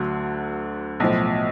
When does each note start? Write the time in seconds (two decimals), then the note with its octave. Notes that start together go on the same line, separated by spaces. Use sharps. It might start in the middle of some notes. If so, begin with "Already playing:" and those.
Already playing: D2 D3 F#3
1.00 B1 A2 F3